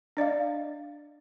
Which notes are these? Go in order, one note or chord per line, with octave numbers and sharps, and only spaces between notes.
D4 D5 D#5 F5